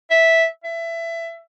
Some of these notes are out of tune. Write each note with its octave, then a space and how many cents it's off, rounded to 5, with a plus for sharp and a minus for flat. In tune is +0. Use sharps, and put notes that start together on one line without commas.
E5 -5
E5 +20